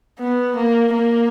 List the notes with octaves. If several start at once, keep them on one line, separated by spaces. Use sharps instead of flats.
B3
A#3
A#3